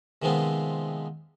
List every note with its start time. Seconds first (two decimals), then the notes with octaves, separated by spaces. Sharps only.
0.22 C3 D#3 F3 G#3 B3 C4